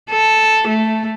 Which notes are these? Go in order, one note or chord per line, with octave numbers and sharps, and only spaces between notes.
A4
A3